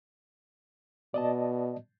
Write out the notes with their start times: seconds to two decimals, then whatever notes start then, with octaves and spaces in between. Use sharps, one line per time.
1.14 B2 D5 D#5 A5